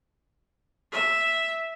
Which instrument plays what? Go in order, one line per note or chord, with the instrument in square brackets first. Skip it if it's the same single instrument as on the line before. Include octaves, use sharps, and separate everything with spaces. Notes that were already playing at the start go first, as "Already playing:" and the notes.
[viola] E5